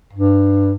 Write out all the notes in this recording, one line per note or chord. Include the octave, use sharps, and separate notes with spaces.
G2